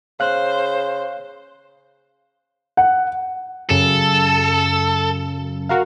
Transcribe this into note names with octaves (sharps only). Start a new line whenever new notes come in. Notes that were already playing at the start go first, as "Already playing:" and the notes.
C#3 C5 F5 F#6
F#5
F#2 C#3 A4
F#4 A#4 F5